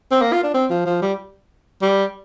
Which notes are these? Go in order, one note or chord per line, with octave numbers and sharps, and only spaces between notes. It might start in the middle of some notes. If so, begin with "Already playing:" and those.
C4
A#3
F4
D4
C4
F3
F3
G3
G3